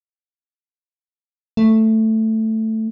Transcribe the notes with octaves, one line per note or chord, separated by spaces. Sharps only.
A3